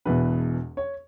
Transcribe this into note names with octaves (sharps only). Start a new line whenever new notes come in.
E1 E2 B2 B4
C#5